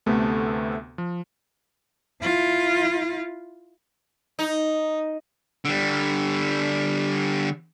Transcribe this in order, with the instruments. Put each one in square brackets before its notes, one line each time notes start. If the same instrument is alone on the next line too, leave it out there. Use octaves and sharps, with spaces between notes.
[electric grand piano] D2 C3 B3 [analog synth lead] A3
[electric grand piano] F3
[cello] E4 F4
[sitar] D#4
[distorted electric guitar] D3 G3